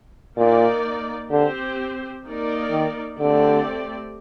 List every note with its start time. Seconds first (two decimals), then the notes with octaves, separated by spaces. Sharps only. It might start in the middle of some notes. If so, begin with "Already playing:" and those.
0.37 A#2 A#3 D#4 A#4 D5
1.31 D3 C4 G4 C5
2.25 A#3 D#4 A#4 D5
2.71 D#3
3.18 D3 A3 C4 G4 D5